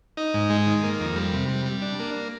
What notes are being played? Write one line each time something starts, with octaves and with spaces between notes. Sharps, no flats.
D#4
G#2
G#3
D#3
A#3
F2
G3
C3
G3
G3
D4
A#3